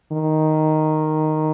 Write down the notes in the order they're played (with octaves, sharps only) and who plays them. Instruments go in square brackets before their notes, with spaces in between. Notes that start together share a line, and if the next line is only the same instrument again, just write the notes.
[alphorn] D#3